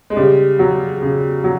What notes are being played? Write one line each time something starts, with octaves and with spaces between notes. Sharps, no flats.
G#3
C#3 G3
F#3
C#3
F#3